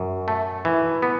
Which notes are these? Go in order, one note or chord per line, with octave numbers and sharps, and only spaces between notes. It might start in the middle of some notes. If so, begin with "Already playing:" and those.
Already playing: F#2
A3
E3
B3